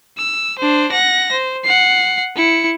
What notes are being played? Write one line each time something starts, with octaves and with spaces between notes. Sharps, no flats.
E6
D4 C5
F#5 A#6
C5
F#5 C7
E4 C#7